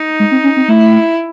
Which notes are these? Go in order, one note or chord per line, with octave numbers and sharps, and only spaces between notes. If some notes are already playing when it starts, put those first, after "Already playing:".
Already playing: D#4
G#3
C4
C#4
C4
A3 E4